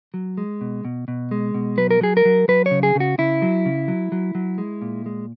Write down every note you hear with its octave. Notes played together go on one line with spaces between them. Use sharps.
F#3
G#3
B2
B2
B2
G#3
B2
F#3 B4
A#4
F#3 G#4
A#4
F#3
F#3 B4
C#5
C#3
G#4
C#3 F#4
C#3 E4
F#3
C#3
F#3
F#3
F#3
G#3
A#2
G#3